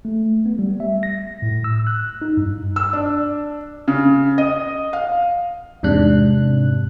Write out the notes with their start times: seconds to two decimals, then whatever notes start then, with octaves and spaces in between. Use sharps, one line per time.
0.05 A3
0.46 B3
0.59 G3
0.80 E5
1.03 A#6
1.42 A2
1.64 E6
1.87 F#6
2.22 D#4
2.37 G2
2.76 E6
2.93 D4
3.88 C#3
4.38 D#5
4.93 F5
5.83 E2 G#2 C3 D4 F#6